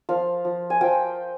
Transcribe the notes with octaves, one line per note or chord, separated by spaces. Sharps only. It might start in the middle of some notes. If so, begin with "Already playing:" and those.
F3 F5
F3
G#5
F3 G5